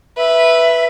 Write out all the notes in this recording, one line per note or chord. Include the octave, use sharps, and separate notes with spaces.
B4 E5